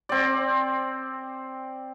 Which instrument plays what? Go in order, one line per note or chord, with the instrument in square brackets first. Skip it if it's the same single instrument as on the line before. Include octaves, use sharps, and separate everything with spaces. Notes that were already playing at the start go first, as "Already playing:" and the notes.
[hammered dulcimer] C4 D5